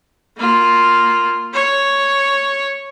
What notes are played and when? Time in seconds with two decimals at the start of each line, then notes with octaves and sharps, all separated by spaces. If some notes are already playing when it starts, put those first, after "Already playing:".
0.38 A#3 F4
1.54 C#5